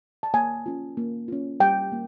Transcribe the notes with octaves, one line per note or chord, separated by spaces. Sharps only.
A5
A#3 G#5
C#4 F4
A#3
C#4 F4
G3 G5
A#3